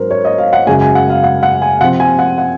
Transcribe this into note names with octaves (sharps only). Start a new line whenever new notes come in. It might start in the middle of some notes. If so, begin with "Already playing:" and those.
Already playing: G#2 F#3 C#4 A#4 C5
C#5
D#5
F5
F#5
F#2 C#3 G#3 G#5
G#5
F#5
F5
F#5
F#5
G#5
C3 F3 C4 F#5
G#5
F#5
F#5